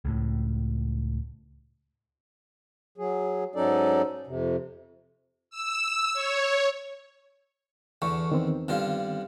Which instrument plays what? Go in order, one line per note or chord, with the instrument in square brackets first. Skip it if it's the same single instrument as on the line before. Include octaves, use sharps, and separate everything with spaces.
[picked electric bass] C#2 A2
[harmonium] F#3 G#4
G#2 F#3 C#4 D#4 A4 D5
F2 C3
[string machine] E6
C#5
[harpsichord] E2 D3 [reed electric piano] A4 C#6
[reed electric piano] D#3 B3 C4
[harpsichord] G2 D3 F4